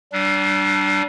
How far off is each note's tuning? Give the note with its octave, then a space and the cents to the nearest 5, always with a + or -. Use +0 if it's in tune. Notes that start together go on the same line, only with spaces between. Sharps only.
G3 -35 D4 +0